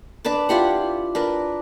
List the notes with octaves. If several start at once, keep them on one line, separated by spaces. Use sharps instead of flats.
D4 B4 A5 D6
E4 F4 G4 F#5
D4 A#4 B4